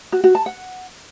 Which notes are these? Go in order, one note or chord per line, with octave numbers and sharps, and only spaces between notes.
F#4
F#4
A5
F#5